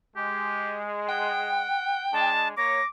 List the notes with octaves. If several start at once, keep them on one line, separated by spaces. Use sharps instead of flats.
G#3 G4
F#5 G5
G#3 D4 D#5 A5
A#3 C#5 D6 A#6